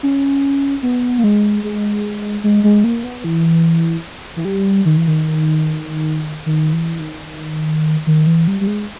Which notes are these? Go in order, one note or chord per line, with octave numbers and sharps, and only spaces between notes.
C#4
B3
A#3
G#3
G#3
G#3
G#3
A#3
B3
E3
E3
G3
D#3
E3
D#3
D#3
E3
D#3
D#3
E3
G3
G3
G#3